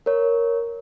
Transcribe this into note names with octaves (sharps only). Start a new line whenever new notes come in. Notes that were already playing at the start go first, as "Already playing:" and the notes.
A#4 C#5